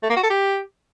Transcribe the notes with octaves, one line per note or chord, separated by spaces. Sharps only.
A3
A#3
F#4
A4
G4